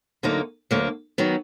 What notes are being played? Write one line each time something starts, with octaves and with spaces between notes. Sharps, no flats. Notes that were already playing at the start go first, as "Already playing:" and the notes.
D2 D3 F#3 A#3 D#4
D2 D3 F#3 A#3
D#3 F#3 B3